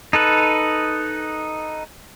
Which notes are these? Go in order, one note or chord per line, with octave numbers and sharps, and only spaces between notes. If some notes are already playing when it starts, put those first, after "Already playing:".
D#4 A4 B4